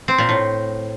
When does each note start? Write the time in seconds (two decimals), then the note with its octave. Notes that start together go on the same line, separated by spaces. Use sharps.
0.08 C4
0.18 A#2
0.29 A2